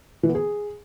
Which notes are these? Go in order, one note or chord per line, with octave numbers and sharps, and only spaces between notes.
E3
B3
G#4